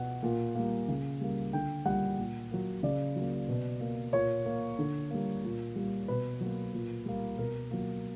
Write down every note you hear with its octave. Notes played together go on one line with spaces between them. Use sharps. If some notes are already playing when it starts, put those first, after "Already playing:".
Already playing: B2 F#5
A#2
G3 A#3
C#3
G3 A#3
D3 G5
G3 A#3 F#5
A#2
F#3 A#3
C#3 D5
F#3 A#3
B2
A#3
A#2 C#5
A#3
D3
G3 A#3
A#2
G3 A#3
B2 B4
F#3 A#3
A#2
G3 A#3
B2 A#4
F#3 A#3